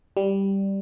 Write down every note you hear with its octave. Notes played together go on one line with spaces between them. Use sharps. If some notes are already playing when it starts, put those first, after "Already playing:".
G3